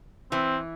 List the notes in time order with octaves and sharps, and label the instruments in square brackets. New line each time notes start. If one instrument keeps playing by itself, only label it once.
[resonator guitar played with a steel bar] E3 [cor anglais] C4